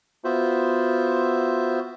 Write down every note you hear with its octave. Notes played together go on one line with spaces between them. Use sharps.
B3 F4 F#4 C5 E5